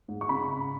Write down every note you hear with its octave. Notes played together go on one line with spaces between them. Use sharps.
G#2
C#6
C#3 B5